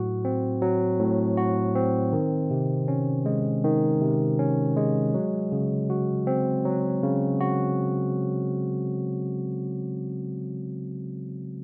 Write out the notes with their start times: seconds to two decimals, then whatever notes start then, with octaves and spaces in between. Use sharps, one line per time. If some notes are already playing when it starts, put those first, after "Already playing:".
Already playing: A2 F#3 F#4
0.25 C4
0.62 F#3
0.99 A2
1.37 F#4
1.75 C4
2.13 D#3
2.51 C3
2.88 C#4
3.26 G#3
3.64 D#3
4.01 C3
4.39 C#4
4.77 G#3
5.14 F#3
5.52 C#3
5.90 F#4
6.27 C4
6.65 F#3
7.03 C#3
7.40 F#4